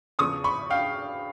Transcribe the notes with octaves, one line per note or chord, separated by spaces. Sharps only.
E2 C#3 F3 C#6 D#6
B5 C#6
F5 G5